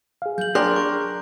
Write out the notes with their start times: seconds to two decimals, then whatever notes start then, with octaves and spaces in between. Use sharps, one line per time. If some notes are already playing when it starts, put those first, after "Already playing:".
0.22 G#4 F5
0.38 F#3 G6 F#7
0.55 D4 G#4 A#4 D5 G5 A#5 C6 F#6
0.76 C#6